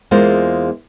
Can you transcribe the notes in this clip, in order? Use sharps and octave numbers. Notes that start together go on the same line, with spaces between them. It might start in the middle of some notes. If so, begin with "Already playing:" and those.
E2 G#3 A#3 F4 C5